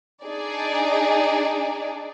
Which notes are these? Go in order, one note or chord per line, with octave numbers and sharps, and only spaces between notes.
D4 D#4 G#4 D5